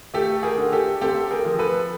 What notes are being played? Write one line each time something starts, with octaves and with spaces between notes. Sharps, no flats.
A3 G4 A4
G#4 A#4
D3
G4 A4
C4 G4 A4
G#4 A#4
F3
A4 B4